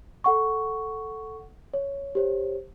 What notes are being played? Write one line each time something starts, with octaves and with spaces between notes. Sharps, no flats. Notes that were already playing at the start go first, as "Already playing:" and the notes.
A4 F#5 C#6
C#5
G4 C5 C#5